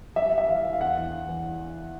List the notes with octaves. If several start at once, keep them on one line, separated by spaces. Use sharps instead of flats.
G3 E5
G3
E5
E3 F5
E3
F5
E2 F#5
E3
E3
E3